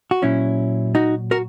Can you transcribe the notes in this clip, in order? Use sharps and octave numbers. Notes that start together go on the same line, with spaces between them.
F#4
A#2 F#3 C#4 E4
D#4 F#4
F#4 A#4